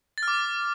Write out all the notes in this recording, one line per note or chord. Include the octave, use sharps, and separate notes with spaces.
A6
F6
D6